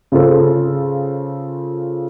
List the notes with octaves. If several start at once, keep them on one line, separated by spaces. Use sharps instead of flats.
C#3 F4 G#4 A4 C5